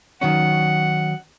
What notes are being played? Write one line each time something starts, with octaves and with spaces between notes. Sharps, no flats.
D#3 F#3 C#4 F#5